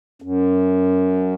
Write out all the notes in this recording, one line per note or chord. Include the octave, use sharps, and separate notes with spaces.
F#2